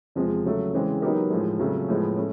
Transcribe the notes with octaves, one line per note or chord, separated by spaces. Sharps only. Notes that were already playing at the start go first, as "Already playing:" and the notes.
E2 C3 F3 G#3
C#3 F#3 A3
C#3 E3 G#3 C4
F#3 B3 D#4 G4 A#4
A2 F3 G#3
F2 C#3 F#3 A3 C#4
A2 F3 G#3 B3
A3 C#4